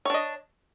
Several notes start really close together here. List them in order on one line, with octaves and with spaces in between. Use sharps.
C#5 D4 D#5